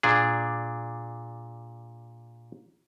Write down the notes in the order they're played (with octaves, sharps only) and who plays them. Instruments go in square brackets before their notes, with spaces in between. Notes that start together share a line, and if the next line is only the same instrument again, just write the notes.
[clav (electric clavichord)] A#2 D4 G#4